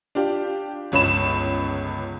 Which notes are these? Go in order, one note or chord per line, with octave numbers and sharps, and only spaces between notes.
D4 F4 G4
G1 C#2 C#5 B5 E7